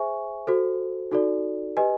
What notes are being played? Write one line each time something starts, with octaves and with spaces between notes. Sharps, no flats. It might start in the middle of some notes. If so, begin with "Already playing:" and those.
Already playing: G#4 C5 E5 G#5 C#6
F#4 A4 C5
D#4 F#4 A4 D5
G4 B4 D#5 G#5